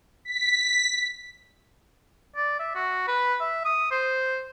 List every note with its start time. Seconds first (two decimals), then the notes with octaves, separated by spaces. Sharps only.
0.25 B6
2.36 D5
2.59 E5
2.75 F#4
3.07 B4
3.40 E5
3.65 D#6
3.91 C5